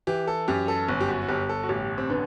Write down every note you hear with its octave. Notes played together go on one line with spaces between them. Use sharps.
E3 G4
A4
F#2 G4
A4
G1
G4
F#4
F#4
G1 G4
A4
F#4
A1 G4
C4
D3 B3